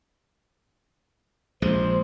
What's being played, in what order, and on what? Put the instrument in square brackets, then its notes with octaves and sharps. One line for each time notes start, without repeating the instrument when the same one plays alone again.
[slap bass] A#1 G#3 [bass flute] C5